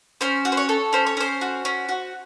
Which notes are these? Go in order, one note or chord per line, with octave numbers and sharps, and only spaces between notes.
C#4 C5
F#4
C5
C#5
A4
C#4 C5
C#5
C#4 C5
F#4
C#4
F#4